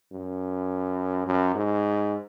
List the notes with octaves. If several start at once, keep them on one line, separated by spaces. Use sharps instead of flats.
F#2
F#2
G#2